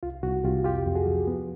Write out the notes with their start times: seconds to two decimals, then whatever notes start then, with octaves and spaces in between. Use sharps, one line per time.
0.03 C2 F4
0.23 C2 F#4
0.44 C2 F4 G4
0.64 F2 F4 G4
0.86 F2
0.95 F#4 G#4
1.06 F3
1.27 B3